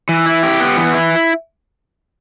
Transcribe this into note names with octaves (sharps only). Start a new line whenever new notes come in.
E3
E4
G4
B3
E3
E4